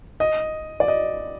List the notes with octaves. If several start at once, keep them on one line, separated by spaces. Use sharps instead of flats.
D#5
D5
D#5